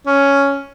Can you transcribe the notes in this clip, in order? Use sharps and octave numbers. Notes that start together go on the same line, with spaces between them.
C#4